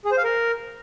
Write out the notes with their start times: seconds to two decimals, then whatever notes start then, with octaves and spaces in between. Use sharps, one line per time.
0.05 G#4
0.11 C5
0.18 F5
0.24 A#4